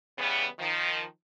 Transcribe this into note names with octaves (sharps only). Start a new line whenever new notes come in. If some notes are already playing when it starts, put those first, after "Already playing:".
C#3 E3 G3 B3
D#3 F3